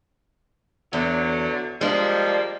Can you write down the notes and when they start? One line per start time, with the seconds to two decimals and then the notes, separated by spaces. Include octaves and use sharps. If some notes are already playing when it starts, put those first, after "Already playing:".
0.93 E2 D3 F#3
1.81 F3 G3 G#3 A#3 D4